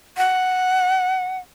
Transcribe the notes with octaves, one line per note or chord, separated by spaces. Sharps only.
F#5